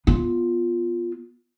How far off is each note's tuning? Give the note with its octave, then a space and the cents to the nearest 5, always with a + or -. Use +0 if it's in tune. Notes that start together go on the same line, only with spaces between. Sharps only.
B3 -10 F4 +0